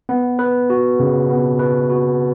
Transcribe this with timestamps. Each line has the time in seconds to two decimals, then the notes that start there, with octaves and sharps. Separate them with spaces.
0.09 B3
0.39 B4
0.70 F#4
0.99 C#3
1.29 B3
1.59 B4
1.90 F#4